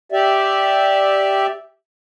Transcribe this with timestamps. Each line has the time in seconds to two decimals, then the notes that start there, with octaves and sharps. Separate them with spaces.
0.12 G4 D5 E5